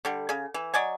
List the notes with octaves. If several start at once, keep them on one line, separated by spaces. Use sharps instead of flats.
D3 G3
C#3 G#4
E3
F#3 D5 D#5 G#5